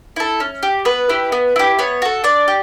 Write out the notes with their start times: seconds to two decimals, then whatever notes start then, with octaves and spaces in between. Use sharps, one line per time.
0.16 E4 A4
0.40 C#4
0.63 G4
0.85 B3 B4
1.10 E4 G4
1.32 B3
1.56 E4 G4
1.79 B3 C#5
2.02 F#4 A4
2.24 D4 D5
2.48 G4